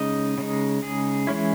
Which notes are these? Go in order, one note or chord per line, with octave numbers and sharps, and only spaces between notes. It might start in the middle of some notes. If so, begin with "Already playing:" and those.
Already playing: C#3 G#3 D#4 D#5
C#3 G#3 D#4
G#4
E3 G#3 C#4 E4